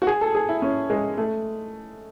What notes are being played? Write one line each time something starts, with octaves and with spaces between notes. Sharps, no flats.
F#4
G#4
A4
G#4
E4
C#4
G#3
A3